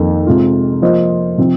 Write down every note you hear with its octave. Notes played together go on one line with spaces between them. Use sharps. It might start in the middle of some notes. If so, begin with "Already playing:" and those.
Already playing: F2 D#3 A#3
C3 G#3 F4
F3 A#3 F4 C5 D#5
C3 F3 C4